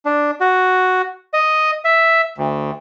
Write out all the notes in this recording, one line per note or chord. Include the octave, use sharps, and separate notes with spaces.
D4
F#4
D#5
E5
D2